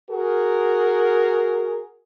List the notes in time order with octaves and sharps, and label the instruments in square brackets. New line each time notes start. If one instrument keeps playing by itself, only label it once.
[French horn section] F#4 G#4 A#4